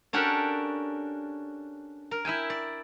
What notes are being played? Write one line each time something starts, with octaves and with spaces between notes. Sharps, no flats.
C#4 D4 F#4 G4 A4 A#4
A#4
E4 E5 G5 G#5
D5